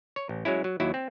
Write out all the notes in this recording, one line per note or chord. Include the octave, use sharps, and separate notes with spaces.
C#5
A1
F#3 G#3 C#4 E4
F#3
D#2 F#3 E4
C4